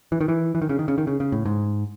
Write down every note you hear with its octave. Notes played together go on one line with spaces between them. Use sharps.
E3
D#3
E3
E3
D#3
C#3
D#3
C#3
D#3
C#3
C#3
A2
G#2